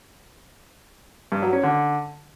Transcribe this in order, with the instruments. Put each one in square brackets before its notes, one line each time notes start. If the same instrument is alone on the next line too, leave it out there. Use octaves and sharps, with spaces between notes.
[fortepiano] G2
F#3
C#4
D3